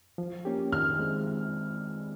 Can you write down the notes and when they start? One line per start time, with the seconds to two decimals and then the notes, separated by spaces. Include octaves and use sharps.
0.18 F3
0.45 A#3 C#4 G4
0.72 D#3 F6
0.99 G#3 C4